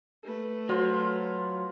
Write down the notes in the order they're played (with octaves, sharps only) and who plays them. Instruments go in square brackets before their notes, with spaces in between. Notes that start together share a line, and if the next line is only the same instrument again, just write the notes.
[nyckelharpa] A3 B4
[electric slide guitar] F#3 [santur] F4 C5 [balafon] F#4